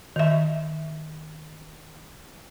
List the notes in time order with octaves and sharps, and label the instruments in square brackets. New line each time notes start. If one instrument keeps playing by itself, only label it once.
[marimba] D#3 E5